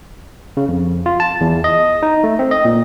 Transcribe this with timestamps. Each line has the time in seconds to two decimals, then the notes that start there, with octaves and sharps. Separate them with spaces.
0.57 C#3
0.69 F2
1.06 F4
1.20 A5
1.41 E2
1.64 D#5
2.03 D#4
2.24 A3
2.39 C4
2.51 D#5
2.65 A#2